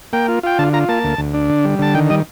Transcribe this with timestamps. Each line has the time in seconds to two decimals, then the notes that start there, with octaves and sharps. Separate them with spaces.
0.13 A#3 G5
0.28 F4
0.43 F4 G5
0.58 D3 A5
0.73 F4 A#5
0.89 A#3 A5
1.04 D2
1.18 D2
1.34 D4
1.49 D3
1.64 G3
1.79 D3 A5
1.95 D#3 G5
2.10 G3 D#5